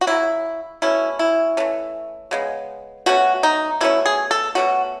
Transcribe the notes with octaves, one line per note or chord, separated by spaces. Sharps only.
F#4
C#3 F#3 A3 C#4 E4
B2 A3 C#4 E4
E4
E3 A3 C#4
C#3 G#3 B3
B2 A3 C#4 F#4
D#4
B2 A3 C#4 E4
G#4
A4
B2 F#3 A3 C#4 F#4